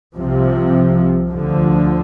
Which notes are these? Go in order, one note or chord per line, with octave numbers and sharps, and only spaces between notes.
C2 C3 F3
D2 D3 F3